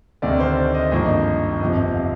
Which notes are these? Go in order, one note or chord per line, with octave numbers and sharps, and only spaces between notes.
D2 C3 D#3 D5
C5
D5
D#5
G#1 G2 F3 A#3 D#5
G1 F2 C3 F3 D#5
F5